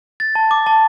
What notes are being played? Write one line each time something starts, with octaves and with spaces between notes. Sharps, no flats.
A6
A5
D6
A5